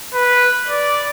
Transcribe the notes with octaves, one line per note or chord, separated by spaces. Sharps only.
B4
D5